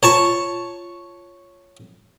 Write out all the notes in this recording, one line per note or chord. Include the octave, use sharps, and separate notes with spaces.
F4 C#5 A5 A#5 C#6